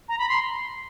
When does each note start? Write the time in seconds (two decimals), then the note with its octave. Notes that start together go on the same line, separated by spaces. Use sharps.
0.09 A#5
0.19 B5
0.29 C6